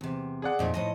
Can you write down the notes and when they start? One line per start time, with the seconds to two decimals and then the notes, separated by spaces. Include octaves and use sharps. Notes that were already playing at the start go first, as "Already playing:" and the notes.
0.01 E2 C3
0.42 G#4 D5 F#5
0.59 F2 A#2 A3 D#4
0.74 A2 F3 D#5